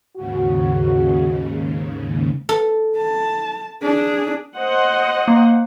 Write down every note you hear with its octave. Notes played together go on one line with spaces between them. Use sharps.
D#2 G#2 C#3 F#4
A4
A5
D4 G#4
C5 D#5 F#5
A#3